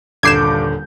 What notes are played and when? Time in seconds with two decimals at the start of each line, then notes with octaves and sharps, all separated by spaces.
0.23 D#1 G2 D3 D6 G6 G#6 C7 E7